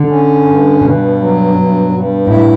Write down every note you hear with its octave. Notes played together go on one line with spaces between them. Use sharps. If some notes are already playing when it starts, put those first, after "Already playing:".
Already playing: D3
C#4
G2
G2 B2
F#3
G2
G2
A2 E4